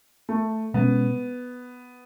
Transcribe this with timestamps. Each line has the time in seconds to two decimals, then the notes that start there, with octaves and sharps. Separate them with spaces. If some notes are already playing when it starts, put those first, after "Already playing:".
0.29 A3
0.74 B2 G#3 B3 C#4